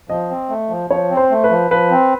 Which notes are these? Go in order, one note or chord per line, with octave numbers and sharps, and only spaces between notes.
F3 D#5
C4
A3
F3
F3 C#5
C4
C5
A3
B4
F3
F3 B4
C4